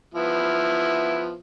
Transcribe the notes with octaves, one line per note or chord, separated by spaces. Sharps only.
F3 B3 E4